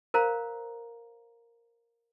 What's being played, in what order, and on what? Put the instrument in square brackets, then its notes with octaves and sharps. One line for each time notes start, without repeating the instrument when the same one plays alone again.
[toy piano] A#4 C5 F5 A#5